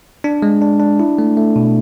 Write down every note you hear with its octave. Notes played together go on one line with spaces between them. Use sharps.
D4
G#3
D4
D4
E4
A3
A3
B2